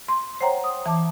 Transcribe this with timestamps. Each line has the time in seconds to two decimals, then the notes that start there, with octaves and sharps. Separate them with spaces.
0.08 C6
0.41 C5 C#5 F#5 G5 A#5
0.64 D#6
0.86 E3 A5 D6